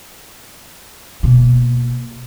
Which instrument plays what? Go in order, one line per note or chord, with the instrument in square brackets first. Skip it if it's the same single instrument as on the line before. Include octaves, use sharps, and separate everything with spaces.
[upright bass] B2 A#3